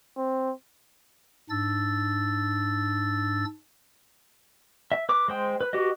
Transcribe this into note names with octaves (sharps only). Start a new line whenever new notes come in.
C4
G#2 D4 E6 A6
E5
B4 D6
G#3 C5 G5
B4
F#4 G4 B4 D#5